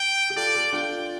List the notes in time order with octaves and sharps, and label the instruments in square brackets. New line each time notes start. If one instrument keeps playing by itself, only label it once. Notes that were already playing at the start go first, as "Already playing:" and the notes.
Already playing: [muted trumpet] G5
[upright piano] G4
[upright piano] F4 A4 [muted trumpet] D5
[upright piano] F4 A4
[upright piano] D4 F4 [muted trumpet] G5